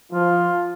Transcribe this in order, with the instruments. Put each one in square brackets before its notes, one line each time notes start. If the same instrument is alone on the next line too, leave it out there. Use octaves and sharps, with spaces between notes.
[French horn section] F3 [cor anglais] F4